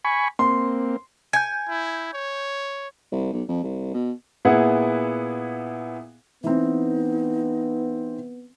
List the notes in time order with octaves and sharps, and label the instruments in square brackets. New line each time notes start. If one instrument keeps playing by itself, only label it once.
[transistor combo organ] G#5 B5 C#6
[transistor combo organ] A#3 C4 [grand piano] C6
[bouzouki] G#5 [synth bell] G6 G#6
[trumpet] E4
C#5
[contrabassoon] C2
B1
F2
C2
B2
[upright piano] A#2 B3 E4 G#4 F#5
[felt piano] E3 C4 [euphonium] B3 [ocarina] D#4